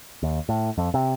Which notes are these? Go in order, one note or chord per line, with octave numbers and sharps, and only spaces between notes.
D#2
A2
F2
C3